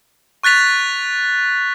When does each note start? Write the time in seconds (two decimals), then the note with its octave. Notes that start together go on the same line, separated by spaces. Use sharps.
0.43 C#6 F#6 A6 B6 F7